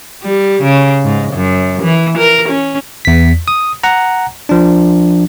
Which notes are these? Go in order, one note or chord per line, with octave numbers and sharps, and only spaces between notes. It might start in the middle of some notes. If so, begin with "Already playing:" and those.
G3
C#3
G#2
F#2
E3
A#4
C#4
E2 B6
D#6
F#5 A#5
F3 D4